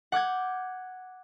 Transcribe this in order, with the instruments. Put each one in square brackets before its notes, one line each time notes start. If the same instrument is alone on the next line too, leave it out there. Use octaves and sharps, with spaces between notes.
[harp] F#5 D6 G6 G#6